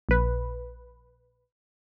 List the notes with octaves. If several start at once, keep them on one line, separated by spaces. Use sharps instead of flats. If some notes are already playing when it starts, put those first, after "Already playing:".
A#1 B4